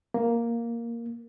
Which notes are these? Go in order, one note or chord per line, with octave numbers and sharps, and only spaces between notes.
A#3